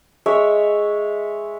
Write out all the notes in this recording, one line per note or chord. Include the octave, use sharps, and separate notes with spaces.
G#3 C#5 E5